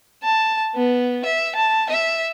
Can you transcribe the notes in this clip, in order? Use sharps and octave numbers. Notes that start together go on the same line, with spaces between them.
A5
B3
E5
A5
E5